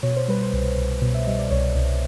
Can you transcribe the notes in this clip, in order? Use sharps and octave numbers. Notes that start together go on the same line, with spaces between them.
B2 C#5
C5
G3 B4
C5
C2
C2
B2
E5
G3 D#5
D5
C2 C#5
C2